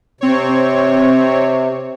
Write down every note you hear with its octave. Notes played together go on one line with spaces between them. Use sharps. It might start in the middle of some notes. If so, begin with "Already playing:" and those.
C3 C4 C#5